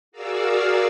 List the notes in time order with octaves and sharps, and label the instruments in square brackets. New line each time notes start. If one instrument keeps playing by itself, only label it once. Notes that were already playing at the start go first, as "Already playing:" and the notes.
[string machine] F#4 G#4 A#4 D5 F5 E6